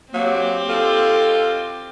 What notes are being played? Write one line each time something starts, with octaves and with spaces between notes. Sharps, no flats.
F#3 A#3 C4 G4
F4 A4